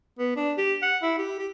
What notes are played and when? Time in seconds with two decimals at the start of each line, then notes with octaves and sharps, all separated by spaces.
0.19 B3
0.36 D4
0.57 G4
0.82 F#5
1.02 E4
1.18 G4
1.39 G4